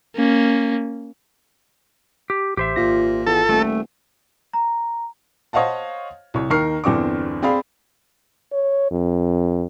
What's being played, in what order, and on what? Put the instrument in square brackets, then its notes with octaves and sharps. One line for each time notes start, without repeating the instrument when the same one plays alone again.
[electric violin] A#3 C#4
[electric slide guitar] G4
[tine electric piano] A1 [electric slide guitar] G4 C5 E5
[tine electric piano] G#1 F4 A#6 [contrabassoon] A#2
[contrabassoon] E2 [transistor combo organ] A4
[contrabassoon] D#1 [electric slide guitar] A3
[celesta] A#5
[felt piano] C5 C#5 D#5 F5 F#5 A5
C2 C#5
D#2 D#3 A#4 C#6 F6 C7
G1 E2 C4 D4 C#6 D6
C4 G#4 D5 F5 B5
[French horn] C#5
F2